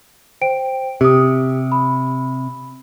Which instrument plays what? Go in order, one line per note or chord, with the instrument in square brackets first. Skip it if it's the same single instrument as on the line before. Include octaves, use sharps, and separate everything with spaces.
[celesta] C5 G5 D7
[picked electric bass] C3 [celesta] G4 D#6
[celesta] B5